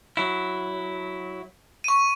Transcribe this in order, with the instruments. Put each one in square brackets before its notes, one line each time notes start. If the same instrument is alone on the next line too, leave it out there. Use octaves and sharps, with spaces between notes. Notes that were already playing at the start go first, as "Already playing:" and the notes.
[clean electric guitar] F#3 E4
[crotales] C#6 D#7